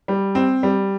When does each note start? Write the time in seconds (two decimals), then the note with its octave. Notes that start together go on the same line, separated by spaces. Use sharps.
0.08 G3
0.35 C4
0.63 G3